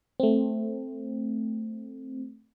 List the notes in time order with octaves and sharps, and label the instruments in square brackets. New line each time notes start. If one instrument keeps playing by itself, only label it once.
[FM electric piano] A3 C4